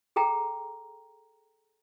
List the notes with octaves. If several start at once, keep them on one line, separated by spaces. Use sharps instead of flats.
G#4 A4 G5 A#5